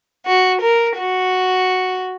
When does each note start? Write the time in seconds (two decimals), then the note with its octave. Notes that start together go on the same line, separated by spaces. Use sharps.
0.26 F#4
0.61 A#4
0.98 F#4